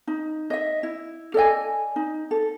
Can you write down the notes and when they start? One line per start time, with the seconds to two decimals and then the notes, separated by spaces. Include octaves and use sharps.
0.07 D#4
0.50 D#5 E5
0.83 E4
1.34 A4 D5 D#5 G#5
1.96 D#4
2.31 A4